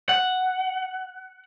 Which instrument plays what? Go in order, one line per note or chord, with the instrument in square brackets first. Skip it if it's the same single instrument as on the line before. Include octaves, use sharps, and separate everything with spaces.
[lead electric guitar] F#5